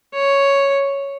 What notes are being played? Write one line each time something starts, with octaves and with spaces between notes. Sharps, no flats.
C#5